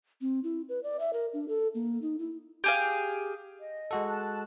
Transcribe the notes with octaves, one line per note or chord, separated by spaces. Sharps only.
C4
E4
B4
D5
E5
A#4
D4
A4
A#3
D#4
E4
G4 G#4 F5
D#5
G#3 F#4 A4
A5 F#6